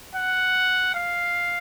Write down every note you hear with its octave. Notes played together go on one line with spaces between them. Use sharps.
F#5
F5